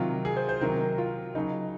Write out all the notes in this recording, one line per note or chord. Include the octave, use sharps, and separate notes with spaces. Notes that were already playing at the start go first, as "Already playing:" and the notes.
Already playing: C3 D#3 F#3 F4
G#4
C5
C5
C3 D#3 F#3 A#4
F4
C#3 F#3 D#4